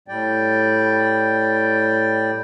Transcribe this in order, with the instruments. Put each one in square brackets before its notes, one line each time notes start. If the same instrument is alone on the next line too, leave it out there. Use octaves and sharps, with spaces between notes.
[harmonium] A2 G3 D5 G5